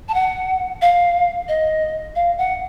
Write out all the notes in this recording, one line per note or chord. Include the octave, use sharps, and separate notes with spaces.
A5
F#5
F5
D#5
F5
F#5